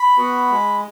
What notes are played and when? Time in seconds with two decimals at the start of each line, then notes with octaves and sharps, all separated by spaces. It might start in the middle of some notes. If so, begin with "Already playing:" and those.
Already playing: B5
0.17 B3 F#4
0.51 G#3